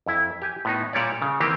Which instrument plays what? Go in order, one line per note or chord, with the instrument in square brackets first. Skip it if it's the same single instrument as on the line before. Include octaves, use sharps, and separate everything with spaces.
[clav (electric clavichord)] F2 E4
G4 G#5
A2 B3 D#4
A#2 G3 C#5 D5
C#3
D#3 E3 A#3 C4 G4